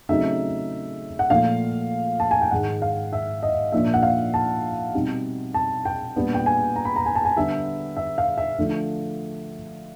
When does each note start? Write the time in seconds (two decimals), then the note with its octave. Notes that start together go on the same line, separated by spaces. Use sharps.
0.09 C#3 F#3 A3 C4 D#4 E5
1.19 F#5
1.30 A#2 F3 A3 F5
2.20 A5
2.31 G#5
2.41 G5
2.51 G#2 D#3 G#3 F#5
2.82 F5
3.13 E5
3.43 D#5
3.72 A#2 F3 A#3 D4 E5
3.94 F#5
4.03 F5
4.34 A5
4.94 B2 G3 C4 D#4
5.54 A5
5.85 G5
6.16 A#2 G3 B3 D4
6.34 G5
6.46 G#5
6.76 A#5
6.85 B5
6.96 A#5
7.06 G#5
7.15 A5
7.25 G#5
7.36 D3 G3 B3 E5
7.97 E5
8.18 F5
8.38 E5
8.58 D3 F3 A3